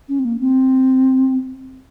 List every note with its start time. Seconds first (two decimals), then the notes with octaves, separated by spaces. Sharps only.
0.09 C#4
0.19 C4
0.25 A#3
0.40 C4